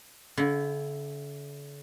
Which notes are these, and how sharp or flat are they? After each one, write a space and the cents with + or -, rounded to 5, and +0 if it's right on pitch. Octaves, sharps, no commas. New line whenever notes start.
D3 -45 E4 +0 F#5 +40